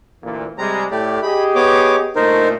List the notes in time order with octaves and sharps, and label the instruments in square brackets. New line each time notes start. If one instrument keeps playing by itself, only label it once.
[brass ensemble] D2 A#2 E3
[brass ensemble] C3 G3 G#3 [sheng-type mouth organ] A#5
[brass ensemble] A2 [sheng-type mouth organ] A3 G4 D5
[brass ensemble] G4 G#4 D#5 [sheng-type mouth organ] B5
[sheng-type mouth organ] B3 C#5 D6
[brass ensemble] G1 A#2 A3 [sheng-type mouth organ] D#4 A#4 C5